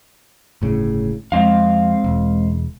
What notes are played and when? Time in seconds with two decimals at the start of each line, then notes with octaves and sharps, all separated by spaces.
0.62 G1 A2 C#3
1.32 F2 G#3 C4 F5
2.04 E1